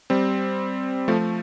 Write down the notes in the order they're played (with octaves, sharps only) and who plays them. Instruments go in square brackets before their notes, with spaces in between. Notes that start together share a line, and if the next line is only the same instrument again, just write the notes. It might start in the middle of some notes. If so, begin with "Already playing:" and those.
[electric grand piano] G3 C4
F3 A3